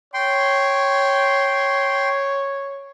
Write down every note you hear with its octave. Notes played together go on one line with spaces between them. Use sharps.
C#5 G5 C6